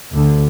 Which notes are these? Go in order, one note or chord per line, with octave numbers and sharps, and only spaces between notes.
D2 D3